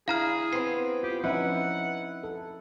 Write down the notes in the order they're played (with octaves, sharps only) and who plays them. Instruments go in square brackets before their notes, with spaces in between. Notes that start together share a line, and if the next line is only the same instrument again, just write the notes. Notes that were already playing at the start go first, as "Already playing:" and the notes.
[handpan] D4 E4 [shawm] G#4 [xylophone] F5 A#5 F6
[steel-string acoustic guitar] B3 C4 [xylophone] C7
[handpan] F4 [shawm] G4
[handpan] F3 C4 C#4 [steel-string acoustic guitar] D#4 E4 B4 [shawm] F#5
[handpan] A4